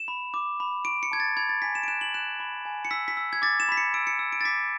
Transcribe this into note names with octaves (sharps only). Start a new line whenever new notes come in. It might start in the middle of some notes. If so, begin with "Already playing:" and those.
Already playing: E7
B5
D6
B5
C#6 D7
C#7
A5 G#6
A6
B5 G#6
A6
G#5 B6
E7
D7
F#6 E7
F#7
F#6 E7
B5
G#5
C#7
E6 B6
B6
E6
G#6
D6 A6
E7
B5 B6
C#7
E6 D7
C#7
E6
D7
A6
D6 B6